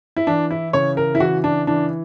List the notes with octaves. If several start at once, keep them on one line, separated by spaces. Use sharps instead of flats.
E4
E3 D4
E4
C#3 C#5
A#4
E4
E3 F#4
D4
E3 D4